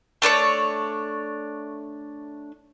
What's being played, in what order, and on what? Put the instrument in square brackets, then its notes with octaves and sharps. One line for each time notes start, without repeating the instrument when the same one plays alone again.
[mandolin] A3 D4 B4 C#5